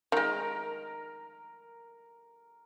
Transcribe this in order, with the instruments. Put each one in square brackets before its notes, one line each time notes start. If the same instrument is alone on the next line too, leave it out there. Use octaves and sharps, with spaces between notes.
[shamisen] D#3 G#3 [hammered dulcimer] A#4 A#5